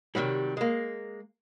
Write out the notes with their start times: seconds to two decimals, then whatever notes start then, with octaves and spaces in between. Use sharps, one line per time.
0.15 C3 D#3 F#3 G3
0.57 G#3 A#3